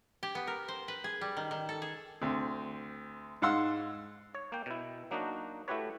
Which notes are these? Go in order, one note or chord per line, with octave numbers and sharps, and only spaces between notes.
G4
B3
A#4
C5
B4
G#4
G3
D#3
D#3
A4
G#4
D2 C4
G#2 F5 F#5 C6 E6
C#5
A#3 G5
B2 E4
F#3 A#3 D4 D#4 F#4
A3 E4 F#4 G4 B4 C#5